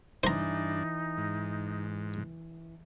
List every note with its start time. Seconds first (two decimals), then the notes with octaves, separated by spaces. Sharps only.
0.24 G2 E3 D4 D#4 C5 A#5
1.17 G#2